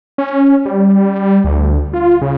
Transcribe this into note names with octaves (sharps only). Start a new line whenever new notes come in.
C#4
G3
D2
F4
C#3